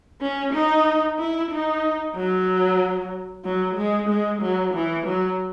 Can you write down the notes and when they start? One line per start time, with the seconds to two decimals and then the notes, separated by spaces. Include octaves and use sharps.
0.21 C#4
0.53 D#4
1.18 E4
1.51 D#4
2.15 F#3
3.45 F#3
3.77 G#3
4.09 G#3
4.42 F#3
4.74 E3
5.06 F#3